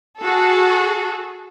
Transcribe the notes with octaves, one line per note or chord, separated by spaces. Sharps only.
F#4 G#4 A4